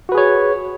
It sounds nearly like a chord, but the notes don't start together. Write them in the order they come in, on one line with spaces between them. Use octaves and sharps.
F#4 B4 G#4 C#5